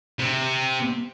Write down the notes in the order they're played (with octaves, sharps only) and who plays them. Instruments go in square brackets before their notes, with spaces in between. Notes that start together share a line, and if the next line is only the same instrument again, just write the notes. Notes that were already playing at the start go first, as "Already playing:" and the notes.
[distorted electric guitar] C3